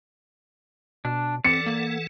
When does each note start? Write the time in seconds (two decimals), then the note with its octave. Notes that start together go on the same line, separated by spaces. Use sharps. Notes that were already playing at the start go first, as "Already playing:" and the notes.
1.05 B2 D4
1.45 E3 C4 A4 D5 F#5 C#7
1.66 A#3